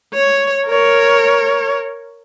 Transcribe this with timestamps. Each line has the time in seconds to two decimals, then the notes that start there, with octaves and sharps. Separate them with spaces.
0.14 C#5
0.67 A#4 C#5